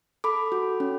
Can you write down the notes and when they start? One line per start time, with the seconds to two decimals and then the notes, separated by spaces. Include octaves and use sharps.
0.24 A4 B5 D6
0.52 F#4
0.80 C#4